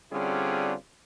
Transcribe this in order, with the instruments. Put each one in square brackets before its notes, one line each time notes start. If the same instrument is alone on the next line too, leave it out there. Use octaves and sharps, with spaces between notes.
[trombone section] D3 G3 C4 C#4 F4 G#4